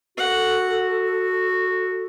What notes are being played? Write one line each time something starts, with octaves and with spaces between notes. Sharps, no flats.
F#4 A4 F#5